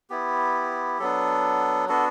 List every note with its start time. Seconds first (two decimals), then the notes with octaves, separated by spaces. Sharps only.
0.10 B3 E4 G4
1.00 F#3 B3 D4 A4
1.88 B3 D4 F#4 A4